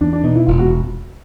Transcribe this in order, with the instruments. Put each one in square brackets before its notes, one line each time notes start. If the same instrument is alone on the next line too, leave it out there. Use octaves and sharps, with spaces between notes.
[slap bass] E2 [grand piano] D4
[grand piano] D4
[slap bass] B2 [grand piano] D#4
[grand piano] E4
[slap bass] E1 [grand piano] F4
[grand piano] F#4